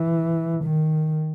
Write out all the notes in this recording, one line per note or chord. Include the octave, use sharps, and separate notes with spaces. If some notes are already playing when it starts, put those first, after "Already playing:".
Already playing: E3
D#3